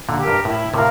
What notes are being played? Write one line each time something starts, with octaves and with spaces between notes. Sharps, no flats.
A#2 D3
G4 A#4
G2
A2 E4
A2 C3 A#4 F5